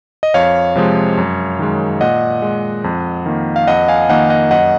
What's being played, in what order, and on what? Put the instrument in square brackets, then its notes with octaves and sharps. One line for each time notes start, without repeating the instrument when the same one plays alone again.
[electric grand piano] D#5
F2 C#5 F5
C3 F3 G#3
F#2
D#3 G#3
A#2 D#5 F#5
G#3
F2
D#3 A#3
F5
F2 D#5 F#5
F5 G#5
D#3 A#3 D#5 F#5
D#5 F#5
F#2 D#5 F#5